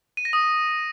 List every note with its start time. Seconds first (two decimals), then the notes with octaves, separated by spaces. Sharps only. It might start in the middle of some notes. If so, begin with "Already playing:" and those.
0.17 D#7
0.25 A#6
0.33 D#6